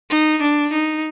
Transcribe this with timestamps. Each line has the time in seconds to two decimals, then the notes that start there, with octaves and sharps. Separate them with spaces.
0.10 D#4
0.41 D4
0.72 D#4